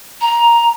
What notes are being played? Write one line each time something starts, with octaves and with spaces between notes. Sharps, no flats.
A#5